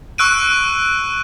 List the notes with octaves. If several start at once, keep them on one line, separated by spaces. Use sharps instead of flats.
C#6 E6 F#6 D7 D#7